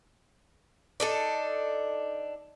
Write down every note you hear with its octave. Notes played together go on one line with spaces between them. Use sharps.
D4 D#4 A4